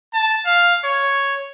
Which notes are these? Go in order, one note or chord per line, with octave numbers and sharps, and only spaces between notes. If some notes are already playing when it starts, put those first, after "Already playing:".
A5
F5
C#5